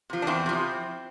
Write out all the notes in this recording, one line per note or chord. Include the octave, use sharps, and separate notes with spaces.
C3 F3
D4
E2 C4 E4
C3 F3